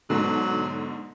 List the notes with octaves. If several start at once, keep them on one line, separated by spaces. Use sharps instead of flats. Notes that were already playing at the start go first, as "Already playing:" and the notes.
G#2 B2 D3 F#3